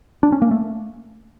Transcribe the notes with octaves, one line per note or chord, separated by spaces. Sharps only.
D4
C#4
A#3
A3